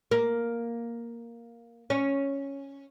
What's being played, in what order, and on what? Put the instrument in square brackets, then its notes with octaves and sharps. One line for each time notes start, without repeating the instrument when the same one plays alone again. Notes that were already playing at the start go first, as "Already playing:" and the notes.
[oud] A#3
C#4